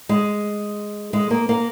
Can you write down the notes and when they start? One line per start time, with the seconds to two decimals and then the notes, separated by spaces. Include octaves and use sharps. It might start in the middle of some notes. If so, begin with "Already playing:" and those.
0.09 G#3
1.13 G#3
1.31 A#3
1.49 A#3